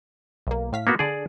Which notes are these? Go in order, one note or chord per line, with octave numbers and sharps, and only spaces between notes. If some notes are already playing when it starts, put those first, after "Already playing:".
B1 A#3
A2 F5 B6
A#3 B3 F#4
D3 D4 G#4 D5